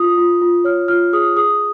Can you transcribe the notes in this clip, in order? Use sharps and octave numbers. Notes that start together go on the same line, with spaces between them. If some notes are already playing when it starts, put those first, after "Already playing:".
Already playing: F4 D#6
F4
F4
C#5 F6
F4 F6
G#4 D#6
G#4 D#6